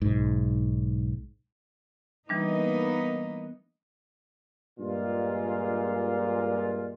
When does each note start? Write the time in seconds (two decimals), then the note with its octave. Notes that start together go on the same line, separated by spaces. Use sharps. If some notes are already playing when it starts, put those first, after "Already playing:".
0.02 B1 G#2
2.29 E3 G3 A#3 B3 D4 D#4
4.79 G2 A#2 G#3 F4